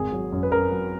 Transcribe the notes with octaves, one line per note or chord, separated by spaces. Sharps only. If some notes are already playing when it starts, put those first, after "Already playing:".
Already playing: G#1 G#4
F#3
F#2
B4
F#2 A#4
F#3